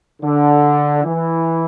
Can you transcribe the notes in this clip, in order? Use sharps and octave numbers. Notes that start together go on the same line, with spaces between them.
D3
E3